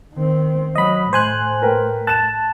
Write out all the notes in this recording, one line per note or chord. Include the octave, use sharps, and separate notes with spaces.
D#3 C4
F#3 D#5 B5
A2 C5 G#5 F#6
A#4 B4 G5
A5 F#6 E7